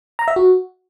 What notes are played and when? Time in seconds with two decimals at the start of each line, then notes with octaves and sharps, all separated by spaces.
0.19 A#5
0.28 E5
0.36 F#4